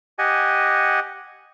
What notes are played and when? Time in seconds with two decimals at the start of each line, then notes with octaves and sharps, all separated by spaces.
0.19 G4 D#5 F#5 G#5